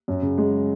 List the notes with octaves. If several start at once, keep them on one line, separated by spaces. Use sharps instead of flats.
F#2
C#3
G#3